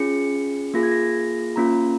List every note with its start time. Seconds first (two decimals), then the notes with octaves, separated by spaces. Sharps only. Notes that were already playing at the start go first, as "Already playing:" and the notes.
Already playing: C#4 F4 G#4 C#7
0.74 A#3 F4 G#4 A#6
0.83 G#6
0.91 A#6
1.56 A#3 C#4 F4 A#5